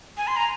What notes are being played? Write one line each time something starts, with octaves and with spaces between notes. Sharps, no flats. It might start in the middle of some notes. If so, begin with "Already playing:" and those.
G#5
C6
A#5